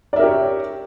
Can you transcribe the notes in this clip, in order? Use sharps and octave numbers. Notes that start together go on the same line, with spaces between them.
G4 A#4 C#5 D5 E5